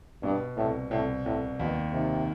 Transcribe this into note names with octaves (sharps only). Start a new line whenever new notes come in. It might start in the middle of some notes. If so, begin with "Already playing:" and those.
G2 B2
C2 A2
C2 A2
C2 A2
D#2 B2
C3 D#3